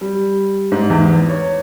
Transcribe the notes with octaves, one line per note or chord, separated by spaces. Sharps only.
G3
G#2
E2
C#5